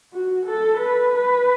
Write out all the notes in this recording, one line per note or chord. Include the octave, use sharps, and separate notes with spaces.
F#4
A4
B4
B4